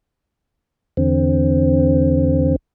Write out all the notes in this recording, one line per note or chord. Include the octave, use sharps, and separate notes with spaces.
E2 D3 C4